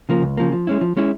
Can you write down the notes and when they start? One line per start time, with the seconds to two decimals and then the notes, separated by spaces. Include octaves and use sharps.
0.09 C#3 F3 A#3
0.22 C#2
0.37 C#3 F3 A#3
0.52 F3
0.67 G#3 C#4 E4
0.81 F3
0.97 G#3 C#4 E4